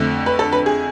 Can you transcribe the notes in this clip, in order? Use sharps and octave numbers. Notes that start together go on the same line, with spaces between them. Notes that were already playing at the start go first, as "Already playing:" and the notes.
Already playing: F2 D3 A3
B4
A4
B4
G#4